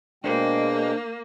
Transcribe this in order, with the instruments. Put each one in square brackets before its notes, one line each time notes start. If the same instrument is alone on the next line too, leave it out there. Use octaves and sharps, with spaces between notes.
[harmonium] B2 G#3 G5 [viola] A#3 [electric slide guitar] D4 C5